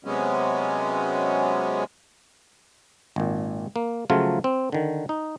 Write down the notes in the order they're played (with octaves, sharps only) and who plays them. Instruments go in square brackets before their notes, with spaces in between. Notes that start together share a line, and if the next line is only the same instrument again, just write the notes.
[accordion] C3 F#3 G#3 B3 C#4
[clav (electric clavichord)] G#1 A#2
A#3
C#3 F3 F#3 A3 F4
C4
D3 D#3
D#4